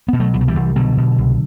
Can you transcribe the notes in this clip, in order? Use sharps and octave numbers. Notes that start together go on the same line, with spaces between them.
B2 B3
F#3 A3
C2 E3
F#3
E3 G3
C2
B2 D3 F#3
B2
C2